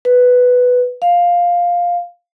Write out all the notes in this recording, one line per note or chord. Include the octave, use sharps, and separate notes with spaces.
B4
F5